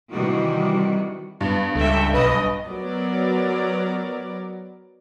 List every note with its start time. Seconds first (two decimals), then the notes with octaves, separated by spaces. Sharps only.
0.12 C3 D#3 E3 G3 F#4
1.41 G2 B3
1.75 C#2 A4 E5 G5
2.14 B1 B4 D#5
2.68 F#3 B3 A#4 D5